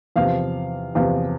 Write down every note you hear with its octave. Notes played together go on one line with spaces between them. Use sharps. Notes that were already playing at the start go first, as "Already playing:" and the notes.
E2 C3 F3 F5
E2 C3 F3 F5